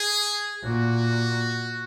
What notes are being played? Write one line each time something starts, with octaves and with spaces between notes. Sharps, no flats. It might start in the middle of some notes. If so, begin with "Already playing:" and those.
Already playing: G#4
A#2 F#4